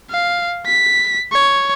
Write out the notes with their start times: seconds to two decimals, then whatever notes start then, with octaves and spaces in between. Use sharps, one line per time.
0.11 F5
0.67 B6
1.32 C#5